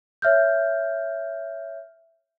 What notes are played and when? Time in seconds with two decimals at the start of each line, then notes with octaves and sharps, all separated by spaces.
0.22 C#5 E5 F6 G6